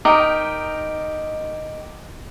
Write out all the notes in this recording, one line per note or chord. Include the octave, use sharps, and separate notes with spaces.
D#4 G4 A#4